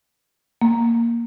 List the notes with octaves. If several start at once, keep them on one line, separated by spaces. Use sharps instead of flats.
A#3